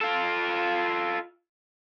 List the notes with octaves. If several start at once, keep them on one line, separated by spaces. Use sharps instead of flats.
F4 A4